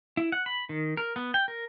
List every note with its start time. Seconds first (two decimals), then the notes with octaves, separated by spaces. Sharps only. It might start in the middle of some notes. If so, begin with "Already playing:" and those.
0.17 E4
0.32 F#5
0.46 B5
0.69 D#3
0.97 A#4
1.16 B3
1.34 G5
1.48 A#4